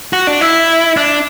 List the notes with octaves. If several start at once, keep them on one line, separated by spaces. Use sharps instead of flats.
F#4
D4
E4
D4